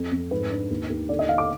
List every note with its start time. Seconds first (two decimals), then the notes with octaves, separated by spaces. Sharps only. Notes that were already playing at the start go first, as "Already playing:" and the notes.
Already playing: F2
0.12 F2
0.31 G#2 B4
0.51 D4
0.70 D#2
0.90 D#2
1.09 D3 D5
1.19 D#5
1.29 D3 F5
1.38 D6